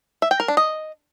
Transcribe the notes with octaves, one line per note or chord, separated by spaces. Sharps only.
E5
G5
A#4
D4
D#5